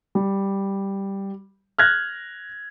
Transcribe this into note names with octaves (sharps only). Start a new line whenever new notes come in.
G3
F6 F#6 G#6 A#6